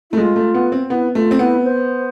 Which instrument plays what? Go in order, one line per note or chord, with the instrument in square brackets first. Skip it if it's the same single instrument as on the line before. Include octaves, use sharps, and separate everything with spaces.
[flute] E4
[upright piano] A3
[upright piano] G#3 [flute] F4
[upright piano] A3
B3
C4
[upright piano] B3 [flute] E4
[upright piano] A3 [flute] F4
[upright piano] C4
[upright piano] B3 [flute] E4
[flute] C5